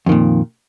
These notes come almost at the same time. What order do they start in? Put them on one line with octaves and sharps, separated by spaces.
F2 D#3 A#2